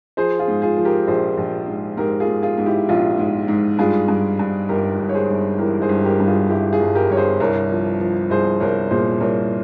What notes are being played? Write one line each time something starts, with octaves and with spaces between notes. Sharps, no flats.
F3 G#4 C5
F4 G#4
G#2
F4 G#4
F3
G4 A#4
A#1 G#4 C5
A#1
G#2
G#2 G4 A#4
F4 G#4
G#2
F4 G#4
G#2
E4 G4
A#1 F4
G#2
G#2
G2 F4 G#4
G2
G2
G1 G4 A#4
G1
C#5
G#4 C5
G1
E3 G4 A#4
G#4 C5
G1
G4 A#4
G2
F4 G#4
G1 E4 G4
F4 G#4
G1
G4 A#4
G1 C#5
G#4 C5
C2 A#4 C#5
F3
F3
C2 G#4 C5
C2 A#4 C#5
A#2 G#4 C5
C2 A#4 C#5